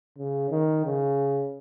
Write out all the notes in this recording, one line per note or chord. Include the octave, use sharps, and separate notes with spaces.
C#3
D#3
C#3